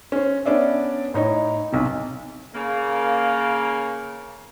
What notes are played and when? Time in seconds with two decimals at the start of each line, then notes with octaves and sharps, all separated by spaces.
0.12 C#4 C5
0.45 B3 C#4 D4 D5 E5
1.14 A2 D#4 C#5 D#5
1.72 B1 C3
2.53 C#3 A#3